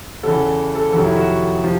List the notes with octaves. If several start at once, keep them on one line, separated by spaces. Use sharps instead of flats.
E2 C#3 E3 A4
A4
F2 C3 D#3 F#3 A4
E4
F#4
C3 F3